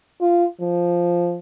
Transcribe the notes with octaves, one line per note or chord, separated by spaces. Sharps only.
F4
F3